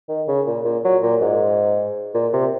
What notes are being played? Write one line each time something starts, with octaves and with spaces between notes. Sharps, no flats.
D#3
C#3
A#2
A#2
F#3
A#2
G#2
A#2
C3